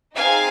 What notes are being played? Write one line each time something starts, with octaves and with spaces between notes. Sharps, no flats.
C4 D#4 G#4 F5 G#5